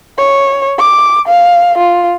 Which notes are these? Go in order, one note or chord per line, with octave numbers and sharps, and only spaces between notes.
C#5
D6
F5
F4